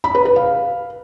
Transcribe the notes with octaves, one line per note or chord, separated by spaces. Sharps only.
B5
B4
B4
F5